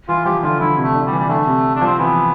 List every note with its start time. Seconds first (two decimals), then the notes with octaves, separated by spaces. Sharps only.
0.08 E3 F4
0.25 F3 G4
0.43 D3 F4
0.60 D3 E4
0.77 C3
0.84 A3
0.95 D3
1.06 G3
1.12 E3
1.19 G3
1.29 D3 A3
1.47 C3
1.75 D4
1.81 F3
1.86 C4
1.99 E3 B3